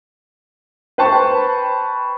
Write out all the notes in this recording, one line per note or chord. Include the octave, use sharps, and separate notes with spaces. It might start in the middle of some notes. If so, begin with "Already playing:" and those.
B4 C5 G5 A5 B5 C#6